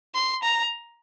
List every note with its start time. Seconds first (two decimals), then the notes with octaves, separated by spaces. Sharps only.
0.14 C6
0.43 A#5